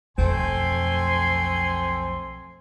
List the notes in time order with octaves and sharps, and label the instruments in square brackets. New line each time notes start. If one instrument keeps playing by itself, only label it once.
[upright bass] B1 F2 [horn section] A3 C4 G#5 [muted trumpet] C6